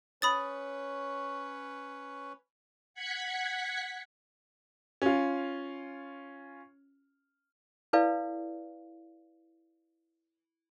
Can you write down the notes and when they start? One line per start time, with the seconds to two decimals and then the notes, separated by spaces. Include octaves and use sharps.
0.22 C#4 B4 C#5 B5 D#6 A6
2.94 F#5 F#6 G#6 B6 C#7
5.02 C#4 F4
7.93 E4 A4 B4 D5 F5